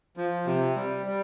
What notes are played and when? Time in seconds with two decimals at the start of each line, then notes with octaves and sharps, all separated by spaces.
0.17 F3
0.46 C3
0.76 G3
1.06 G3